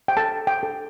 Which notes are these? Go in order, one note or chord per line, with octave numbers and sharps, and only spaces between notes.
G5
A4 A5
G5
A4